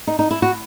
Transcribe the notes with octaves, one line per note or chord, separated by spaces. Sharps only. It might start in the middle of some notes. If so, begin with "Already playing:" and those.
D#4
D#4
E4
F#4